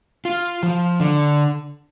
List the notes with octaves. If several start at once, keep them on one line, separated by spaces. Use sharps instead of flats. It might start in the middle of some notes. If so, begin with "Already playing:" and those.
F4
F3
D3